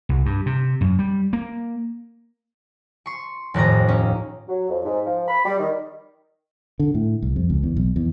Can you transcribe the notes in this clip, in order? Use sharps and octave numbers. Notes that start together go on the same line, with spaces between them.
C2
G2
C3
F#2
G3
A#3
C6 C#6
F1 D#2 A2 A#5
C#4
F#3
F2
G#2
F3
B5
G3
D#3
D3
A2
C2
F2
C#2
E2
B1
E2